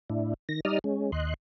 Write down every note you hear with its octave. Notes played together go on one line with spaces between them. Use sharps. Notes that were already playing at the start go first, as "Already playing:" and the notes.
A2 D4 E4
D#3 A#6
G3 D#4 D5 D#5 D#6 F6
G#3 C#4
D#2 D#5 C6 F#6